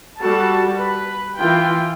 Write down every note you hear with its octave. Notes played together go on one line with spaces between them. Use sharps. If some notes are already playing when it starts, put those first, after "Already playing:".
G3 F#4 A4 A5
B4
E3 F4 G5